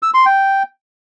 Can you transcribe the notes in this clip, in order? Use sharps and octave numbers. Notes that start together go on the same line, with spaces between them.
E6
C6
G5